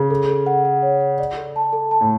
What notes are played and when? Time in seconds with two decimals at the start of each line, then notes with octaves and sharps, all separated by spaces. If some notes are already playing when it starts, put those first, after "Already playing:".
Already playing: C#3
0.10 A4
0.28 A4
0.46 F#5
0.65 F#5
0.82 C#5
1.01 F#5
1.19 D5
1.37 A4
1.56 A5
1.73 A4
1.91 A5
2.01 A2